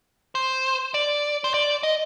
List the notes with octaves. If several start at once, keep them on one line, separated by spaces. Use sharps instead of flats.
C5
D5
C5
D5
D#5